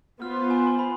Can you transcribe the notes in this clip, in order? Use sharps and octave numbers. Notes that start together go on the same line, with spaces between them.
B3 F4 C5 F6
G#5
C6
B5